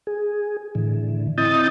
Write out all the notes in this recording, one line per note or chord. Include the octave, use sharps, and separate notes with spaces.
G#4
A2 D3 E3
C4 E4 D#5 D#6 G6 A6